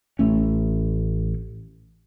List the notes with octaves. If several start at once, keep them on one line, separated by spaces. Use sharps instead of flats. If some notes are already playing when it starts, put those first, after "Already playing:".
A1 A3 C#4